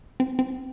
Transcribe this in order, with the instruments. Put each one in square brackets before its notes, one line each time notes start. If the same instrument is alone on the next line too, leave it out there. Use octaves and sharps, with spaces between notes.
[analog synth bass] C4
C4